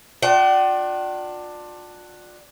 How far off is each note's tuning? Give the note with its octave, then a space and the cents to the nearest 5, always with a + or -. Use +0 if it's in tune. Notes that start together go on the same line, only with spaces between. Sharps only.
D4 +15 F4 +40 G5 -45